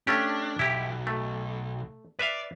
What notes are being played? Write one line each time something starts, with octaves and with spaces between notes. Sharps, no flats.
A3 C#4 D4 G4
B1 E4 G4
A3
B4 D5 E5 F5